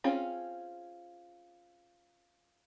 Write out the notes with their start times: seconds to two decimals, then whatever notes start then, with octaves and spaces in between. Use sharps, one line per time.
0.04 C4 C#4 F4 G#4